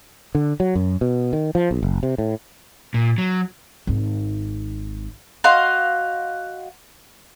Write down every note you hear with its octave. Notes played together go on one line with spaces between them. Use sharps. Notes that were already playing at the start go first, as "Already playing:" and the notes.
D3
F#3
F#2
B2
D#3
F3
B1
F#1
C3
A2
A#2
F#3
G#1 D#4
F#4 D#5 F5 C6